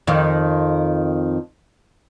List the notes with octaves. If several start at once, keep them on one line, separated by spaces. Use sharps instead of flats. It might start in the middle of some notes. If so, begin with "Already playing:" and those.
F2 D#3